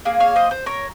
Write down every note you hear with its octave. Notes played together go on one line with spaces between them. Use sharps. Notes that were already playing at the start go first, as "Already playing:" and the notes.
A#3 F4 G#4
C#5 F5
C5 D#5
C5
A#4 C#5